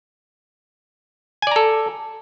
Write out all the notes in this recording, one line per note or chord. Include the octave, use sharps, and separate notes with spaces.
A4 D5 G#5 A#5